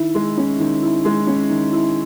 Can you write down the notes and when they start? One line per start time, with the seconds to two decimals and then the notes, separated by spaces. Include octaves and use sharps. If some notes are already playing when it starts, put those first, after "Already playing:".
Already playing: D#3 E4
0.15 G#3
0.37 C#4
0.60 D#3
0.82 E4
1.05 G#3
1.27 C#4
1.50 D#3
1.72 E4